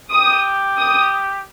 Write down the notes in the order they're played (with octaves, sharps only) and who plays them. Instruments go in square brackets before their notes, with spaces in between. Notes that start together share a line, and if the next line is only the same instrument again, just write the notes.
[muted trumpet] G4 [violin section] D#6
[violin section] D#6